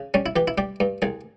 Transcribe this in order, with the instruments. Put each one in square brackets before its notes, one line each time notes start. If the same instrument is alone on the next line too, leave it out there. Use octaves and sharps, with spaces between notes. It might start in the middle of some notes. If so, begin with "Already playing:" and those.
Already playing: [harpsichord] C#3
G3 C#4
E4
E3 G4
E4
G3 G4
G2
C2 G#4